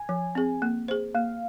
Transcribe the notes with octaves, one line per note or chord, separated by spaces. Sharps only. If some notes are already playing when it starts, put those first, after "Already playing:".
Already playing: G#5
F3
C4 G#4
A#3
G#4 C5
A#3 F5